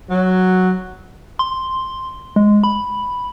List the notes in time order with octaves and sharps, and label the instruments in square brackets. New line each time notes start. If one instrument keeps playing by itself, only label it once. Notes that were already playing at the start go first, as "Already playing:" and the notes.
[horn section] F#3
[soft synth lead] C6
G#3
B5